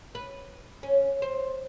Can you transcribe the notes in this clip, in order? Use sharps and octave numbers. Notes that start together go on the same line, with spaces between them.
B4
C#4
C5